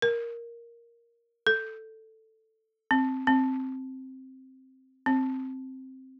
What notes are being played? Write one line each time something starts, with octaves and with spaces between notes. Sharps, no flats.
A#4
A4
C4
C4
C4